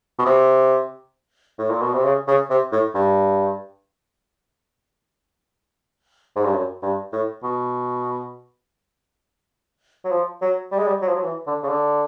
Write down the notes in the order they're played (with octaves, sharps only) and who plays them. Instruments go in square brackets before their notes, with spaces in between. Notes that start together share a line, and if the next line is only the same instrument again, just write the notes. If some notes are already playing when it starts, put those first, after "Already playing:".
[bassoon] B2
C3
A2
A#2
B2
C3
C#3
C#3
C3
A2
G2
G#2
G2
F#2
G2
A2
B2
F#3
F3
F#3
G3
G#3
G3
F#3
F3
F#3
E3
D3
C#3
D3